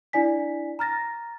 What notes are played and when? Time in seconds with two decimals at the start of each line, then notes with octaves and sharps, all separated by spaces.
0.13 D4 E4 D5 G#5 B6
0.79 A#5 F6 A6 A#6